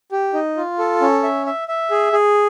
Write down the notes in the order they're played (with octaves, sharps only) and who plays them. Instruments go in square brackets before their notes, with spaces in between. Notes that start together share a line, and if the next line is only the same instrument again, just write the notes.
[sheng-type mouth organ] G4
D#4
F4
A4
C#4
E5
E5
E5
G#4
G#4